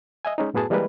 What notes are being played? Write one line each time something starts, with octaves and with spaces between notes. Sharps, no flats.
D#5 E5 G#5
G#3 C#4 D#4
F#2 A2 B3 F#4 G#4 A5
E3 G3 G#3 A#3 A#4 B4